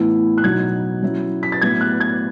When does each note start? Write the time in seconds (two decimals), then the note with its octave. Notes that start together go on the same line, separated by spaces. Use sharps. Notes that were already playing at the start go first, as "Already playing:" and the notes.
Already playing: A2 E3 B3 E4
0.38 F#6
0.44 B2 F#3 B3 D#4 G#6
1.03 F#3 C#4 E4
1.43 B6
1.52 A6
1.61 A2 F#3 B3 E4 G#6
1.81 F#6
2.00 G#6